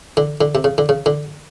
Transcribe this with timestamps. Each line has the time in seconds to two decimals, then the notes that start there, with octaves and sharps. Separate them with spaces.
0.17 D3
0.41 D3
0.55 C3
0.64 C#3
0.78 D3
0.89 C#3
1.06 D3